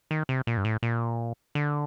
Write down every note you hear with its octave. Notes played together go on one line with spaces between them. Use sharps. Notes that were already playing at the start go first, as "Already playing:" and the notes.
D#3
C3
A#2
G2
A2
A#2
D3